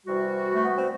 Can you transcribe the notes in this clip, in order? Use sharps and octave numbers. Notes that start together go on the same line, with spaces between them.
C3 E3 G3 F#4
A3
B3
C4